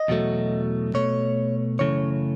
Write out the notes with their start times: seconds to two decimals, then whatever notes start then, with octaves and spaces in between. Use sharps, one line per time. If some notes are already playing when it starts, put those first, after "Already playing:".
Already playing: D#5
0.08 E2 B2 F#3 A3
0.94 B2 A3 C#5
1.79 F#2 C#3 E3 A3 C#5